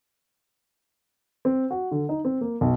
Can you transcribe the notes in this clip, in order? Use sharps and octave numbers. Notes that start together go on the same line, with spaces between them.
C4
F#4
D3
D#4
C4
A#3
B1